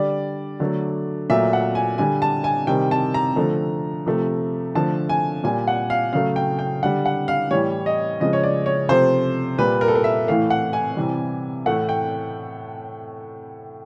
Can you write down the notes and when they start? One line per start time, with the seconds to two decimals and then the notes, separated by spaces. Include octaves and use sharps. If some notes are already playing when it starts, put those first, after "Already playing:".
Already playing: D3 G3 D5
0.60 D3 F#3 A3
1.29 A#2 F#3 A3 E5
1.53 F#5
1.75 G#5
1.98 D3 G3 G#5
2.22 A5
2.44 G#5
2.67 C3 D#3 G3 G5
2.91 A5
3.14 A#5
3.36 D3 F3 A3
4.06 C3 F3 A3
4.75 D3 F3 A3 A5
5.09 G#5
5.44 A#2 G3 G#5
5.68 F#5
5.90 F5
6.13 C#3 F#3 A3 F5
6.36 G5
6.59 G5
6.83 D3 G3 F#5
7.06 F#5
7.28 F5
7.51 A2 E3 G3 C#5
7.86 D#5
8.20 C#3 F3 G#3 D#5
8.33 C#5
8.43 D5
8.66 C#5
8.89 C3 F3 A3 C5
9.58 A#2 G3 B4
9.81 A#4
9.88 A4
9.95 A#4
10.04 E5
10.27 A2 E3 A3 F5
10.50 F#5
10.73 G#5
10.97 C3 E3 G3
11.66 A2 E3 A3 F#5
11.89 G5